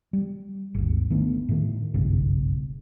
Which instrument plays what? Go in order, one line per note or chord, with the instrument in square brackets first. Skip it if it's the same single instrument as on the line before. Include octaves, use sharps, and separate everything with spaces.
[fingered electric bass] G3
G#1 D#2
D#3 A3 B3 D4
A2 D#3
F#1 B1 G2 C#3